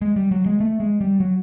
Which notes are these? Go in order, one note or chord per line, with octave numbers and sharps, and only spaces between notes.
G#3
G3
F#3
G#3
A3
G#3
G3
F#3